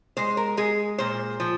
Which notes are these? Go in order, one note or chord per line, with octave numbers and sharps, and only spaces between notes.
G#3 C5
A#4
G#3 G#4
A#2 C5
F3